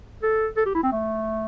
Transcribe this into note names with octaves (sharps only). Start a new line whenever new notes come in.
A4
A4
G4
E4
C4
A3